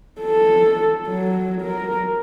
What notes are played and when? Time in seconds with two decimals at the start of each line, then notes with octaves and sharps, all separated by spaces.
0.20 A4
1.08 F#3
1.62 A#4